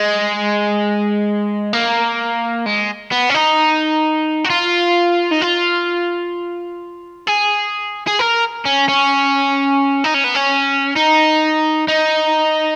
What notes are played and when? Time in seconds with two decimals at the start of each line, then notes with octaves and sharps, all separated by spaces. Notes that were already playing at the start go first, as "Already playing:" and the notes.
Already playing: G#3
1.73 A#3
2.66 G#3
3.12 B3
3.30 C#4
3.34 D#4
4.44 F#4
4.50 F4
5.32 D#4
5.42 F4
7.27 G#4
8.07 G#4
8.19 A#4
8.66 C#4
8.88 C#4
10.04 D#4
10.14 C#4
10.24 B3
10.35 C#4
10.96 D#4
11.88 D#4